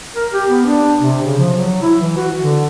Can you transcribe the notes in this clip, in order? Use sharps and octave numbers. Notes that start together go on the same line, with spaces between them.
A#4
G4
B3
D4
C3
C#3
F3
F#3
E4
E3
F#4
D3